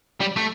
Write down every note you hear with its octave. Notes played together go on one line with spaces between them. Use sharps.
G3
A3